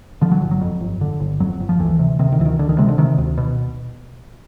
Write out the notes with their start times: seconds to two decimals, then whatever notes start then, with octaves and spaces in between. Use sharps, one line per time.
0.21 D3 F3
0.31 F#3
0.42 G1
0.51 F#3
0.61 F2
0.81 G1
1.01 D3
1.20 G1
1.40 F2 F#3
1.60 G1
1.69 F3
1.80 D2 E3
1.99 C3
2.19 C3 D#3
2.32 D#3
2.40 D2 E3
2.45 D#3
2.59 D2 D3
2.69 D#3
2.78 C3 G#3
2.89 D3
2.98 C3 D#3
3.18 D2
3.38 B2